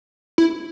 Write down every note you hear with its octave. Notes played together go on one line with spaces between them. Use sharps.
E4